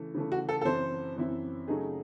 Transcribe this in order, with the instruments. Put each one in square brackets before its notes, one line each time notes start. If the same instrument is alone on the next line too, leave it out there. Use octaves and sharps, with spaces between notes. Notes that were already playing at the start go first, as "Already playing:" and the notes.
Already playing: [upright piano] C#3 E3 A3
C#3 E3 A3
[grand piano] F#4
A4
A4
[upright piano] F#2 E3 C4 E4 [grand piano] C5
[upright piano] F#2 E3 C4 E4
C#3 F#3 A3 D#4 G#4